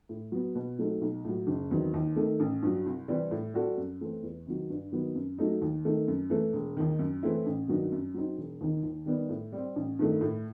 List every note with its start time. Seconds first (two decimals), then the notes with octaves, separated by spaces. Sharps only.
0.09 A2
0.32 F#3 B3
0.55 B2
0.79 F#3 A3 C4 D#4
1.01 B1
1.25 A2 F#3
1.47 F#1
1.71 E2 D#3 F#3 C4
1.94 D#2
2.16 D#3 A3
2.40 A1
2.62 G2 F#3
2.86 C2
3.08 C3 E3 G3 C4
3.31 A2
3.54 G3 C4 F#4 A4
3.77 F#2
4.01 E3 A3 C4
4.23 E2
4.46 C3 D#3 F#3
4.70 G2
4.92 D#3 F#3 B3
5.15 F#2
5.38 F#3 A3 D#4
5.62 D#2
5.85 D#3 A3
6.08 F#2
6.30 E3 A3
6.53 E1
6.77 D#2 D#3
6.99 F#2
7.23 E3 A3 C4 E4
7.46 A1
7.68 G2 D#3 F#3
7.92 F#2
8.14 F#3 C4 D#4
8.37 E1
8.61 D#2 D#3
8.83 D#2
9.06 D#3 G3 B3
9.29 A2
9.52 G3 C4
9.76 A1
9.99 G2 D#3 A3
10.21 A2